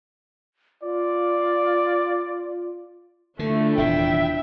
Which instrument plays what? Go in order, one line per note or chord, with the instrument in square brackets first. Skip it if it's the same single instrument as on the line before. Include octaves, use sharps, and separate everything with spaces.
[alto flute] F4 [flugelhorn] D5
[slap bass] D3 [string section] A3 [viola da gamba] D4 E4 F4
[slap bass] D#1 E2 C3 [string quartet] E5 [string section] G5